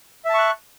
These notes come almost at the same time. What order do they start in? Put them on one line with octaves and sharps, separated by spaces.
E5 A5 C#6 F#6